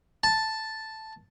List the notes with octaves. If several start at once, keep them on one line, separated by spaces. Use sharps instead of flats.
A5